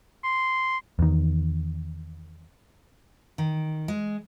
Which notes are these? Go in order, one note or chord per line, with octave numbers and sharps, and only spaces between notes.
C6
E2 D#3
D#3
G#3